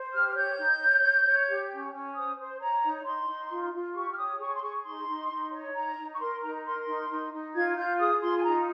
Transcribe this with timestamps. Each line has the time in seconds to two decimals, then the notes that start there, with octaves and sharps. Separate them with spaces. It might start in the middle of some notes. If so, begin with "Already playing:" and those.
Already playing: C5
0.12 G4 F6
0.28 F6
0.35 C#5 G6
0.57 D#4
0.80 C#5
1.02 C#5
1.25 C#5
1.47 G4
1.70 C#4
1.92 C#4
2.15 C5 D#6
2.38 C5
2.59 C#5 A#5
2.83 D#4
3.04 D#4 C6
3.27 D#4
3.50 F4
3.73 F4
3.94 G4 C#6
4.11 F6
4.17 C#5 D#6
4.39 G#4 C#6
4.54 C6
4.61 G#4 C#6
4.84 D#4 C6
5.07 D#4
5.30 D#4
5.51 C#5
5.74 D#4 A#5
5.97 D#4
6.13 C#6
6.19 A#4 C6
6.41 D#4 A#5
6.65 A#4 C6
6.87 D#4
7.09 D#4
7.32 D#4
7.54 F4 G#6
7.76 F4 G6
7.98 G#4 D#6
8.21 F4 C6
8.36 G#5
8.43 D#4 A#5